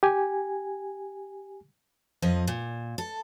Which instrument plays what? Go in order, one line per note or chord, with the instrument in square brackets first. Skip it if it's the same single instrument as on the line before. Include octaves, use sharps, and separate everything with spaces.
[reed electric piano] G4 G#5
[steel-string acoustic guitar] F2 F3 D#5
A#2
A4